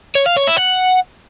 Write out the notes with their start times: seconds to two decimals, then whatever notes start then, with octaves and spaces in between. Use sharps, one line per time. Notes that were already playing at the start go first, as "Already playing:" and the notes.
0.15 C#5
0.26 F5
0.37 C#5
0.47 E4
0.58 F#5